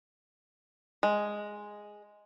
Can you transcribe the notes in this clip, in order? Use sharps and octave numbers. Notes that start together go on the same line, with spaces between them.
G#3